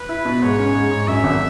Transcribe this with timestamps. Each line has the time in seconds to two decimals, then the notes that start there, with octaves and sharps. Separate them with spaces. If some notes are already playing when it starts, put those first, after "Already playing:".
Already playing: B4
0.09 E4
0.25 B2
0.42 G#2 C#5
0.59 C#4
0.75 G#2
0.91 G#2
1.08 F#2 E5
1.24 G#1